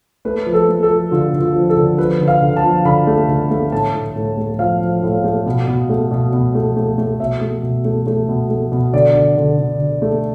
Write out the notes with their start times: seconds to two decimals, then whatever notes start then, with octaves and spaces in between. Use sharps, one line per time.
0.25 A3 B4
0.46 F3
0.54 A4
0.68 A3
0.83 A4
0.90 F3
1.11 D3 F4
1.33 D3
1.41 F4
1.55 F3
1.69 A4
1.77 D3
1.98 F3 B4
2.20 D3
2.28 F5
2.42 D3
2.57 A5
2.63 F3
2.85 D3 B5
3.07 A3
3.28 D3
3.50 A3
3.72 A2 A5
3.94 A2
4.16 A2
4.37 A3
4.59 F3 F5
4.81 F3
5.03 A2
5.24 A3
5.46 B2
5.68 B2
5.89 A3
6.11 B2
6.33 B2
6.55 A3
6.76 A3
6.98 A3
7.20 B2 E5
7.41 A3
7.63 B2
7.85 A3
8.07 A3
8.28 B2
8.50 A3
8.72 B2
8.93 D3 D5
9.15 D3
9.37 D3
9.59 D3
9.80 D3
10.02 A3